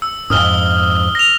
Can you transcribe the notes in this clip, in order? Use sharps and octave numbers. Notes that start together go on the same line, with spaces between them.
E6
F2 G#2 D#6 F6 G7
A#6 F7